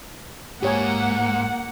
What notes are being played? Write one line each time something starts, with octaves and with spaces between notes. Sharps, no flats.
G#2 A#3 G4 C#5 F#5 G#5